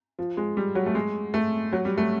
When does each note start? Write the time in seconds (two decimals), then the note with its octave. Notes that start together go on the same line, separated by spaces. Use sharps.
0.19 F3
0.37 G#3
0.57 G3
0.75 F#3
0.86 A3
0.95 G#3
1.34 A3
1.73 F#3
1.85 G3
1.98 A3